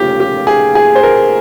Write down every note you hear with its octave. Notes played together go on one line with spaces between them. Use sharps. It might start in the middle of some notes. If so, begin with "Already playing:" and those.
Already playing: F1 D#2 C#3 F4 G4
G4
G#4
G#4
C5
A#4